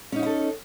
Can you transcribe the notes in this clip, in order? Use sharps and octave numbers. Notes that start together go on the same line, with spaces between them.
C#4 D#4 E4 F#4 A4